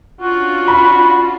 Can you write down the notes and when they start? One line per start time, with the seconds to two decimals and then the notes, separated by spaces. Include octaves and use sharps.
0.21 C#4 D4 F4 F#4
0.68 B5